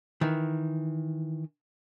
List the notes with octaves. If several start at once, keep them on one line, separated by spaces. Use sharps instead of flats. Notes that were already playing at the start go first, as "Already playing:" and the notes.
D#3 E3